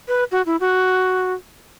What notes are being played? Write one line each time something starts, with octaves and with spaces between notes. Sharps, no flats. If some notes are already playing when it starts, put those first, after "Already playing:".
B4
F#4
E4
F#4